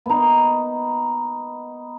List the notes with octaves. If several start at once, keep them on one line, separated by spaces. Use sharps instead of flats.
B3 D#4